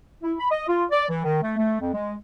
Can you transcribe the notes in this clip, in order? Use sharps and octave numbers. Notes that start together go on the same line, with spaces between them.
E4
B5
D#5
F4
D5
E3
D#3
A3
A3
F2
G#3